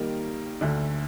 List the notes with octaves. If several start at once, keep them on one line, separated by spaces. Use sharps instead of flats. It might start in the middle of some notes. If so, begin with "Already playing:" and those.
Already playing: D#3 G3 A#3 D#4 A#4
D2 D3 A3